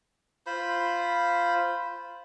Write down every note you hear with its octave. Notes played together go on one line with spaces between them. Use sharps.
F4 C5 B5